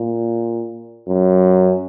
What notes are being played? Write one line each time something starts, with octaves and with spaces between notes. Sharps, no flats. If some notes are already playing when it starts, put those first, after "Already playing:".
Already playing: A#2
F#2